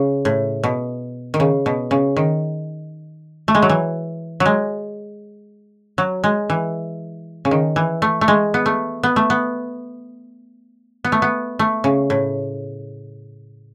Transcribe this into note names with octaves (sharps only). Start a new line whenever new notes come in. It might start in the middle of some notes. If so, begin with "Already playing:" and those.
Already playing: C#3
A2
B2
D#3
C#3
B2
C#3
D#3
A3
G#3
F#3
E3
F#3
G#3
F#3
G#3
E3
C#3
D#3
E3
A3
A3
G#3
B3
A3
B3
A3
B3
B3
A3
B3
A3
C#3
A2